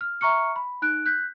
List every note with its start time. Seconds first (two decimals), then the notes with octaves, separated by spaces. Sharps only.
0.01 F6
0.21 E5 A#5 C#6 F6 C#7
0.56 B5
0.82 D#4 F#6 D7
1.06 F#6 G6 B6